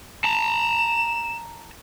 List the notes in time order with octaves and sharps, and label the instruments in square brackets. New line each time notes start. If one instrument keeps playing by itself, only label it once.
[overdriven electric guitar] A5 A#5 [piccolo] E7